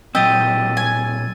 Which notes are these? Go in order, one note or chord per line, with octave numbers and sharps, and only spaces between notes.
A#2 F#3 C4 G4 D#5 E6 A6 D#7
G#5